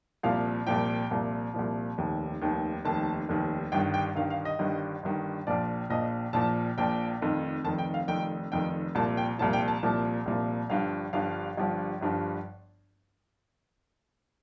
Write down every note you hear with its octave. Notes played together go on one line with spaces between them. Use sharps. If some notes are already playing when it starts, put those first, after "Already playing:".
C2 A#2 F3 F5
C2 A#2 F3 G5
C2 A#2 F3
C2 A#2 F3
F1 D#2 D#3
F1 D#2 D#3
F1 D#2 D#3 A5
F1 D#2 D#3
G1 G2 D#3 G5
G5
G1 G2 D#3 F5
F5
D#5
G1 G2 D#3
G1 G2 D#3
A#1 A#2 F3 D5
A#1 A#2 F3 D#5
A#1 A#2 F3 A5
A#1 A#2 F3 G5
F1 F2 D#3
F1 F2 D#3 A5
G5
F5
F1 F2 D#3 G5
F1 F2 D#3 G5
C2 A#2 F3 A5
G5
C2 A#2 F3 A5
G5
A5
C2 A#2 F3
C2 A#2 F3
G1 G2 F3 F5
G1 G2 F3 F5
G1 G2 F3
G1 G2 F3